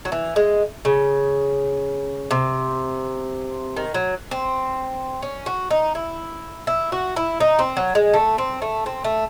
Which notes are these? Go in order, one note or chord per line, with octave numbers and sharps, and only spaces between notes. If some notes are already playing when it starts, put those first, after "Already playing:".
F#3
E3
G#3
C#3
C3
D#3
F#3
C4
C#4
F#4
D#4
E4
E4
F#4
E4
D#4
C4
F#3
G#3
A3
C4
A3
C4
A3